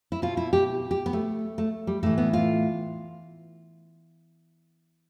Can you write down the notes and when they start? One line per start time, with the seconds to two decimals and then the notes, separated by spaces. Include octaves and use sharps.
0.12 E4
0.22 B2 F4
0.37 E4
0.53 G4
0.91 G4
1.06 B3
1.13 A3
1.58 A3
1.87 G3
2.03 A2 E3 A3
2.18 B3
2.33 F4